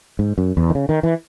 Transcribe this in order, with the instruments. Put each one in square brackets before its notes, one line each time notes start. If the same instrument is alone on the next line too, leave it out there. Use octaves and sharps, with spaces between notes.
[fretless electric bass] G#2
F#2
E2
D#3
C#3
D#3
E3